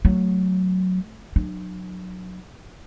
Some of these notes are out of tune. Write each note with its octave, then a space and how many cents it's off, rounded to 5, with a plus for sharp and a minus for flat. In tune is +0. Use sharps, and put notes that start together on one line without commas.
F#3 +0 A3 +0
F#3 -15 D4 +40